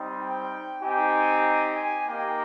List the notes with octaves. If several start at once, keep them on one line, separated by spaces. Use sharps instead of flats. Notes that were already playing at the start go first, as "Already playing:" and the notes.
Already playing: G3 C4 D#4
G5
C4 D#4 G4 G#5
G#5
A#3 D#4 G4 G5